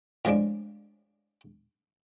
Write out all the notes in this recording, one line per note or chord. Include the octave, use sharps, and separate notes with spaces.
A2 F3 G#3 D4